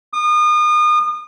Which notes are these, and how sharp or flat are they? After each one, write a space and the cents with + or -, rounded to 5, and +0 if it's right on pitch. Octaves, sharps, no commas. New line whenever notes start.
D#6 -35